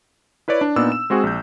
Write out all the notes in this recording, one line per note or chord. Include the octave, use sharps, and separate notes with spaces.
E4 B4 C#5 D5
D4
A#2 B3 D4 D#4 E6
E7
G#3 C4 F#4 G#4
A#1 G6